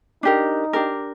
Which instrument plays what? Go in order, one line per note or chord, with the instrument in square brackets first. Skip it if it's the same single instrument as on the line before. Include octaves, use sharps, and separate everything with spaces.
[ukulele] D4 G4 A#4 [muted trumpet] D#4
[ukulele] D4 G4 A#4